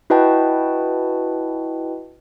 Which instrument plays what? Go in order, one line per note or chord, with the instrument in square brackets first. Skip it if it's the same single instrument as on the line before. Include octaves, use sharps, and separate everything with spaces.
[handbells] E4 F#4 B4 D#5 G5 A5